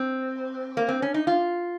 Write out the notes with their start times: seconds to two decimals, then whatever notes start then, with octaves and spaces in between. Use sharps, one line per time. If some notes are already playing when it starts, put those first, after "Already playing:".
Already playing: C4
0.77 A#3
0.88 C4
1.02 C#4
1.14 D#4
1.27 F4